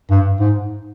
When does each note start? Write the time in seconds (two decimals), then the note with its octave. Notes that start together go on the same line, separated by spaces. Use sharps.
0.11 G2
0.40 G#2